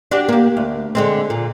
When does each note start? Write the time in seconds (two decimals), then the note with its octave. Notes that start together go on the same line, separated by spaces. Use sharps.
0.11 D4 F#4 G4
0.29 A#3 G4
0.57 D2
0.95 D3 G#3 C4
1.30 A#2